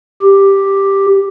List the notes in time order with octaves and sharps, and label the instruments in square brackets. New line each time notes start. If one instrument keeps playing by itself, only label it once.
[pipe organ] G4